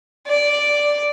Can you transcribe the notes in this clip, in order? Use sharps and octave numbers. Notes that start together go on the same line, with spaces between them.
D5